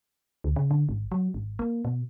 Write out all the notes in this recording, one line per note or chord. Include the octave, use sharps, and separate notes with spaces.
D2
C#3
D3
G#1
F#3
G#1
A#3
B2